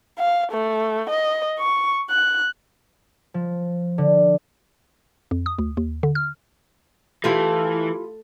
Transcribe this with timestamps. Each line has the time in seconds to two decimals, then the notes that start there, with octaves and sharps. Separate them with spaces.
0.18 F5
0.52 A3
1.10 D#5
1.59 C#6
2.10 F#6
3.34 F3
3.98 D3
5.31 F2
5.46 D#6
5.58 D2
5.77 D#2
6.03 D3
6.15 F6
7.24 E3 A3 E4 F4 G4